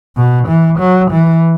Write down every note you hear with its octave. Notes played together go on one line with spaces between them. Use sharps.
B2
E3
F#3
E3